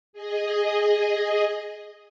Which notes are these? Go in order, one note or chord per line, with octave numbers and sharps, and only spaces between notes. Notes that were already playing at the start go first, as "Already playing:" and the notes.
G#4 D#5